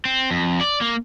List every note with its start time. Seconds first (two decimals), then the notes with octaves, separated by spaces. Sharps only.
0.05 C4
0.31 F2
0.61 D5
0.81 A#3